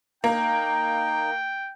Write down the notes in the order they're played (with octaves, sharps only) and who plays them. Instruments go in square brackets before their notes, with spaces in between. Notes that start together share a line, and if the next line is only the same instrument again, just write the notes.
[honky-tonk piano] A#3 [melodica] D#4 [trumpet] G5